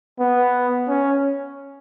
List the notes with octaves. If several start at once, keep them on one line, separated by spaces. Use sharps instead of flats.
B3
C#4